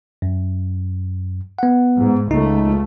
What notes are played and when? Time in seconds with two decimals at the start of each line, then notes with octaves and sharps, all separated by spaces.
0.22 F#2
1.59 B3 F#5
1.98 G#2
2.31 C#2 A3 D#4